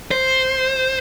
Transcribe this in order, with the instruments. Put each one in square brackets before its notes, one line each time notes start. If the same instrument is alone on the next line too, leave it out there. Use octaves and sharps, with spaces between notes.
[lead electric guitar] C5